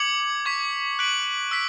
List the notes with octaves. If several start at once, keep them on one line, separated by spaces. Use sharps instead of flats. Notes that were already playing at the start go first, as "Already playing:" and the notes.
Already playing: D6 G#6 C#7 F#7
C#6 G#6 B6
F#6 B6 D7 F#7
E6 B6 D7